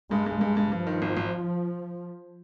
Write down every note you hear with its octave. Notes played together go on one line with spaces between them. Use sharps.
G2 G#3
G2
G2 G#3
G2
G2 F3
D#3
G#1
G#1